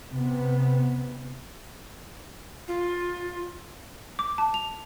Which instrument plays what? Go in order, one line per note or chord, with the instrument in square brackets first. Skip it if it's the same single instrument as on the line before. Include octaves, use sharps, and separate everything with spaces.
[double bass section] C3 B3
[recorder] F4
[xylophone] D6
A5
F7